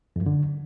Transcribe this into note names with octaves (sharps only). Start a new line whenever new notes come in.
F2
F#2
D3